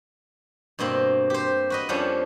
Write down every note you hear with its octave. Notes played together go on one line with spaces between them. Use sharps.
G2 B2 A#3 C4
G4 C5
F#4 B4 D#5
F2 F3 G3 A#3 C#4 D4